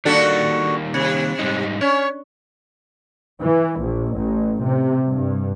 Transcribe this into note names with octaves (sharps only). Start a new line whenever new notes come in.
D#3 G3 A#3 D4 F#4 A4
C3
G#2 G3 D#4
C#4 C#5
E3
A#1
A1
C3
G2